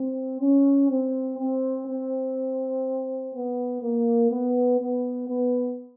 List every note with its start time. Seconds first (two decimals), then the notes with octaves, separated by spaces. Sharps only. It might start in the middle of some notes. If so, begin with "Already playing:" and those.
Already playing: C4
0.41 C#4
0.90 C4
1.39 C4
1.88 C4
3.34 B3
3.83 A#3
4.31 B3
4.81 B3
5.29 B3